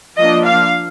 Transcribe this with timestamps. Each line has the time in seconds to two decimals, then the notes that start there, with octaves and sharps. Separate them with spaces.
0.17 F3 A#3 D4 D#5
0.46 F5